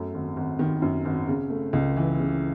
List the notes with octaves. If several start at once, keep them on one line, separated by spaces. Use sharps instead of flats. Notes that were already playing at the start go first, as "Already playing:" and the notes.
Already playing: F#2 A3
G#1
G#1
D#3
F#2
G#1
C#3
A3
C#2
E3
C#3